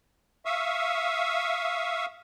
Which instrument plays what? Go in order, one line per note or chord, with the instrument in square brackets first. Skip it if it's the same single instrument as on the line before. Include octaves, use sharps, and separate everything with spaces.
[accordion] E5 F5 C#6 D#6 E6